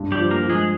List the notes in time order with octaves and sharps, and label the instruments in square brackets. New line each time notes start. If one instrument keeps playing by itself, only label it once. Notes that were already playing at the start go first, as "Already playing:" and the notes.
Already playing: [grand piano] G2
[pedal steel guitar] G3 G4
[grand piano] F3
[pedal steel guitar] A#3 A#4
[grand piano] F3
[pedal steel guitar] G#3 G#4